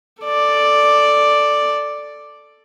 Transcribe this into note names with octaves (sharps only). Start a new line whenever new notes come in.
A4 D5